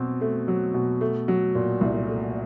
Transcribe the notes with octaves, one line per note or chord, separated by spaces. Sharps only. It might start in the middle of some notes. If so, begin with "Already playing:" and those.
Already playing: B2 F#3 C4
A3
F#3
B2
A3
F#3
A#2
C2
A3